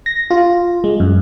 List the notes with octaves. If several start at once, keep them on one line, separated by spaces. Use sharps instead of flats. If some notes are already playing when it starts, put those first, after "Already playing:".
A#6
F4
G#3
F#2